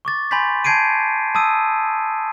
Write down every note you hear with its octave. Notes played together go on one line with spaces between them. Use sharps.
C#6 D6 A6
G#5 B5 C6 G6 A6 B6
A5 G6 G#6 C7 D7 D#7
A5 D#6 E6 D#7